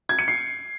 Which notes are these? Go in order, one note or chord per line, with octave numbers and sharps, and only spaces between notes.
G#6
C#7
C7